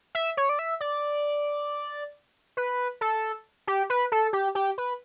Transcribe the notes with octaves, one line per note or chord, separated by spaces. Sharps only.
E5
C#5
D5
E5
D5
B4
A4
G4
B4
A4
G4
G4
B4